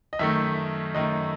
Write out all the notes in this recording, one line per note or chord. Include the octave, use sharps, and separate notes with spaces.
D#5
F#2 D#3 A3 E5
F#2 D#3 A3 D#5